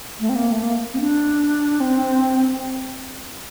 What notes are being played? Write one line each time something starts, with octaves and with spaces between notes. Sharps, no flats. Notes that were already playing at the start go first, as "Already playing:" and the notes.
A3
C4
A#3
A3
A#3
C4
D4
C4